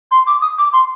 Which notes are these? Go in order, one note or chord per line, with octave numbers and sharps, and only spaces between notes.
C6
D6
D#6
D6
C6